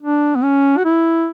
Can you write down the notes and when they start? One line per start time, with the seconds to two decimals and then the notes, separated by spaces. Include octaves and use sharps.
0.02 D4
0.36 B3
0.44 C#4
0.77 F#4
0.85 E4